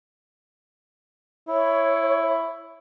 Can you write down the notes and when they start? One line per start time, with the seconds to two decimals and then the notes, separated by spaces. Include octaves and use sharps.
1.48 E4 C#5